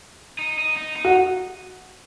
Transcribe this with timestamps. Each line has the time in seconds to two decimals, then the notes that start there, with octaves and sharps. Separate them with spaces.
0.39 D#4
0.58 D#4
0.77 D#4
0.96 D#4
1.05 F#4